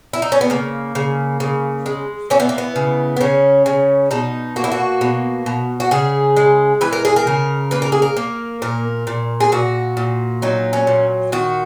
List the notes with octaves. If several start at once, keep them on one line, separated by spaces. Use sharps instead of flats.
E4
D#4
C#4
B3
C#3 A#3
C#3
C#3
G#3
E3 C#4
B3
A#3
B3
C#3
B3
C#3 C#4
C#3
B2 D#4
A#3 F#4
E4
F#4
B2
B2
F#4
C#3 G#4
G#3
E3 B4
A#4
G#4
A#4
C#3
A#3 B4
A#4
G#4
A#4
A#3
A#2 A#4
A#2
G#4
A#2 F#4
A#2
F#3 D#4
C#4
A#2
D#3 F#4